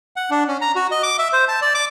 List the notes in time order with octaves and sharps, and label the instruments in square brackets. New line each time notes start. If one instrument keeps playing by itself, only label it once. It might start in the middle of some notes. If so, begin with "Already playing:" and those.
[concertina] F#5
D4
C#4
A#5
F#4
D#5
D6
E5
C5
A5
D5
D6